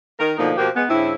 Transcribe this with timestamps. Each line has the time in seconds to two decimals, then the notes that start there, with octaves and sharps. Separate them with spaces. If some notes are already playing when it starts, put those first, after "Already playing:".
0.19 D#3 A#4
0.38 B2 D3 F3 A#3 D#4
0.57 B2 F3 A#3 F#4 G4
0.76 G#3 B3
0.89 G2 C#3 C4 E4